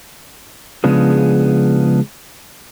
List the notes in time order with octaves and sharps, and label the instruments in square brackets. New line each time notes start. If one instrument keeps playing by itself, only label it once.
[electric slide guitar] C#3 F3 G#3 B3 D4 G#4